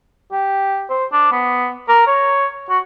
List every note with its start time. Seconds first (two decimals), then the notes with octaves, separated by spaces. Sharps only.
0.32 G4
0.90 C5
1.13 D4
1.32 B3
1.89 A#4
2.07 C#5
2.69 F#4